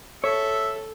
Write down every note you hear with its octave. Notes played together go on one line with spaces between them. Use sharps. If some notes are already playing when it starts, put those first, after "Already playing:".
A4 C#5 E5